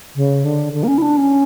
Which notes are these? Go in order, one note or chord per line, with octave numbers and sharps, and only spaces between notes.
C#3
D3
D3
A#3
C#4
E4
D4
C#4